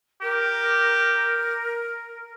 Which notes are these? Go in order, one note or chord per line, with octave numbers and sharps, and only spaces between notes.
G4 A#4